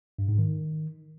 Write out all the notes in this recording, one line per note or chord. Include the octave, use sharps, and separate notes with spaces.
G2
G#2
D#3